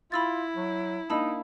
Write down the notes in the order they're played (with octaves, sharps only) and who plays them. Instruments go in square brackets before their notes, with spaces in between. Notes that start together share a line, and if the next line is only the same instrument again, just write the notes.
[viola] E4 [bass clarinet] F4 [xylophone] B5 E6 A6
[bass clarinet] F#3
[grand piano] A#3 D4 D#5 [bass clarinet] D#4 [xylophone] A5 B5 E6